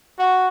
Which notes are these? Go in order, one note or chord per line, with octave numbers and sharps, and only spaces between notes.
F#4